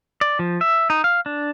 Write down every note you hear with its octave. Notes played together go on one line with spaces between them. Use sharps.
D5
F3
E5
D#4
F5
D4